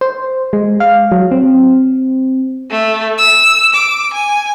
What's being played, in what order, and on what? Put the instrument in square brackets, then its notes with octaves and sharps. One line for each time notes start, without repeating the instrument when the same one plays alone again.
[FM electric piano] C5
G#3
F5
F#3
C4
[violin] A3
E6
D6
G#5